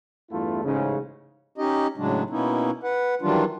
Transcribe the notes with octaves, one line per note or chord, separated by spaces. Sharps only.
E2 G2 A3 E4 F4
A1 G#2 C#3
C#4 D#4 G4 D#5
A2 C#3 F#3 G#3 D4
B2 A#3 B3 C#4 D#4 E4
B4 F#5
D#3 E3 F#3 G3 D4 F4